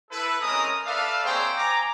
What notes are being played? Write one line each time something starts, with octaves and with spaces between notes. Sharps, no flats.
E4 A4 B4
G#3 C4 C#4 A#4 A#5 D#6
A4 B4 D5 E5 F5
A#3 C4 G#4 C5 C#5 G5
G#5 A#5 D6